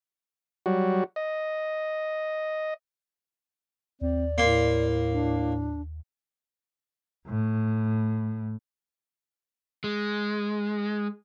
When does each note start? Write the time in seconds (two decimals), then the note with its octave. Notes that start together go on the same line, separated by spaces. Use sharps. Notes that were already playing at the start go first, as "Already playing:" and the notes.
0.66 F#3 G3 F#4
1.16 D#5
4.02 D#2 C4 D5
4.38 A2 A#3 C6
5.13 D4
7.27 A2
9.84 G#3